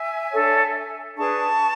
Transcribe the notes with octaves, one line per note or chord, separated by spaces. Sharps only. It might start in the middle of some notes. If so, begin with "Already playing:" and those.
Already playing: E5 G#5
D4 A4 C#5
D4 G#4 B4 A5 C#6